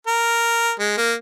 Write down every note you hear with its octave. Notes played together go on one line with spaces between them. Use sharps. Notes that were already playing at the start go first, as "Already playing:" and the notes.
A#4
G#3
A#3